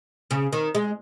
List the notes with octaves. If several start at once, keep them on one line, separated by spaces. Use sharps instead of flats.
C#3
D#3
G#3